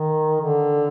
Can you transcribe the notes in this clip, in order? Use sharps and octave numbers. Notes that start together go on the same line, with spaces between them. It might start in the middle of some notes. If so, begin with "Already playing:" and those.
Already playing: D#3
D3